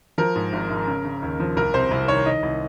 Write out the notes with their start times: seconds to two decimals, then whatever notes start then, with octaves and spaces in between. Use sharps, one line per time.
0.18 F3 A#4
0.35 G#2
0.53 G#1
0.70 G#1
0.87 C#3
1.05 C#3
1.22 D#2
1.40 F3
1.57 C2 A#4
1.74 C3 C5
1.91 C2
2.08 D#3 C#5
2.26 D#3 D#5
2.43 C2